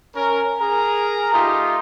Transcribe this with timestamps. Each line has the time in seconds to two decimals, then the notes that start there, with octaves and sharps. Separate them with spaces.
0.16 C#4 A#4
0.61 G#4 A#4 A#5
1.33 A3 D#4 F4 G4